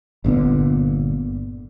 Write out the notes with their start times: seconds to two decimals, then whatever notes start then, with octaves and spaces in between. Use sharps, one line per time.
0.24 G1 A#2 D3 B3